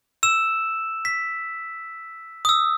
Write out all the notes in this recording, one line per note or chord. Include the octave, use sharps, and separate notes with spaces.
E6 E7
B6
D#6 E6